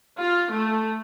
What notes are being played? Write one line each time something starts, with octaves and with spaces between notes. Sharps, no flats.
F4
A3